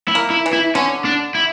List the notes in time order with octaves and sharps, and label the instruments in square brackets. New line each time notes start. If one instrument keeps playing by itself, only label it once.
[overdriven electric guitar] E4
[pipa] A#3
[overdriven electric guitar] E4
[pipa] E3
[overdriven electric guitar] E4
[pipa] D3 [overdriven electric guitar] C#4
[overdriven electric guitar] D4
E4